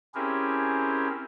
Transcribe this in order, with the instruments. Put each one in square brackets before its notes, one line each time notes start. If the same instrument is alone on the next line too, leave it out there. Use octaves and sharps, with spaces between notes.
[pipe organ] C4 C#4 E4 G4 G#4 A#4